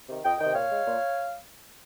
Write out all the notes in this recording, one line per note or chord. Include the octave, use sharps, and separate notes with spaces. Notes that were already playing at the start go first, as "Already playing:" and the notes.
C3 D#3
F2 D#5 G5
C3 D#3 D#5 G5
A#2 C#5 F5
G#3
A#2